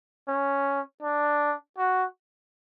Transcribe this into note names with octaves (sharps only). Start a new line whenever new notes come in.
C#4
D4
F#4